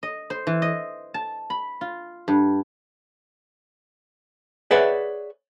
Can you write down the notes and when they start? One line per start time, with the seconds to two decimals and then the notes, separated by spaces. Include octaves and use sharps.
0.03 D#5
0.30 C5
0.47 E3
0.62 D#5
1.14 A5
1.50 B5
1.81 F4
2.28 G2
4.71 G#4 B4 C#5 D5 E5 F#5